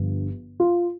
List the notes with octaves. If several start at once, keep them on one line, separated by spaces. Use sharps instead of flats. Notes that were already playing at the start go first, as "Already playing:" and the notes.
Already playing: G1 G2 F3
F4